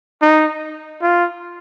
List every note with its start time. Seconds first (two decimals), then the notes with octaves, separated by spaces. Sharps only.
0.22 D#4
1.02 F4